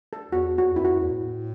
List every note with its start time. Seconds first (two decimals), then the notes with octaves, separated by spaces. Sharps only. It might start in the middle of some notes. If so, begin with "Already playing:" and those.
0.13 A4
0.31 E2 F#4
0.58 F#4
0.72 E2
0.76 F#2 E4
0.85 E2 F#4
0.94 F#2
1.01 E2
1.11 A2